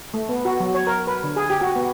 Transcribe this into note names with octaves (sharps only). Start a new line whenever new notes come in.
A3
B3
F#4
F#3
C#5
A#4
B4
D3
G#4
G4
F#4
B3